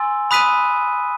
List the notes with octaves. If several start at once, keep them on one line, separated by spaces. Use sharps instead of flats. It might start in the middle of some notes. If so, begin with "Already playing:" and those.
Already playing: G#5 C6 E6 A6
B5 D#6 F#6 B6 D#7